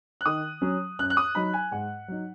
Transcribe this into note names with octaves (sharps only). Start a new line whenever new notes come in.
F#6
D#3 D#6
F#3 C#4
F#2 F#6
F#6
D#6
F#3 D#4 B5
G#5
G#2 F#5
F#3 D#4